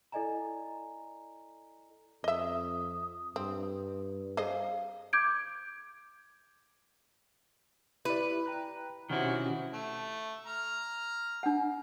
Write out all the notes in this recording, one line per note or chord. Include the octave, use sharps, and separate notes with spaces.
E4 A4 D5 D#5 G#5 A#5
F2 D#5 E5 D#6
G2 C4
G#4 C5 D#5 F5
D6 G6 G#6 D7
E4 G4 B4 D5
G5 A#5 F#6
B2 D#3 C4 C#4 E4 F#4 G4
A3
A#5 F6
D4 F#5